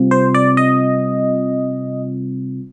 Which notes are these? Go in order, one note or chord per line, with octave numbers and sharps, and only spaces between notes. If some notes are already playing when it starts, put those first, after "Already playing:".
Already playing: C3 G3 C4 F4
C5
D5
D#5